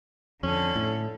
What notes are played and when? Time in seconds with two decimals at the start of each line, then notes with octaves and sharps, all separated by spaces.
0.43 F2 D3 C#4 A4
0.76 A2